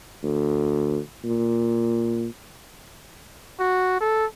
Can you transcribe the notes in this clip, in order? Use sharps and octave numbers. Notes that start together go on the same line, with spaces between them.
D2
A#2
F#4
A4